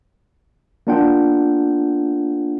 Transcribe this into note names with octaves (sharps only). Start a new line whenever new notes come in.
A#3 B3 D4 F4 F#5 G5